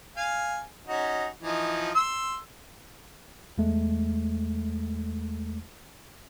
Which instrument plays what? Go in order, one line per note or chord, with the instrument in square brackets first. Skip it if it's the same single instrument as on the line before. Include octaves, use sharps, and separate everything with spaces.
[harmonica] F5 G#5
C#4 D#4 F#4
E3 F3 D#4
C6 E6
[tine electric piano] E2 G#3 A3